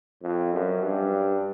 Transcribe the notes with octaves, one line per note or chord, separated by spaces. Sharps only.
F2
F#2
G2